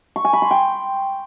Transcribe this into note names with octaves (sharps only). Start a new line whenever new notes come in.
C#6
G#5
B5
C6
G5